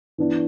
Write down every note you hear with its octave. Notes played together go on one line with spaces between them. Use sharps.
E3 B3 D4